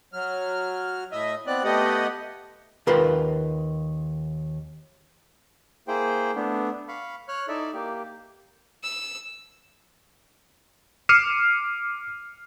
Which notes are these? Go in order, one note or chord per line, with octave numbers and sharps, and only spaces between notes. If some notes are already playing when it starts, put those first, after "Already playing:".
F#3 F6
A2 D#5 E5
B3 C4 D5 F#6
A3 B3 G4 D#5 F#5
D#2 F4 A#4 B4 C6
A#3 E4 G#4 C5 G5
A3 B3 D4
F5 B5 C#6
C#5 C#6 F6 F#6
D#4 E4 A4 D5 E5
A#3 G4
E6
D6 F6 C7 C#7 D#7 E7